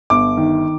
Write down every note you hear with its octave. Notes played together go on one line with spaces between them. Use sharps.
G1 D6
D#3